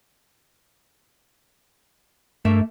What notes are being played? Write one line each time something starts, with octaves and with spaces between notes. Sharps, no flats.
G2 A3 A#3 E5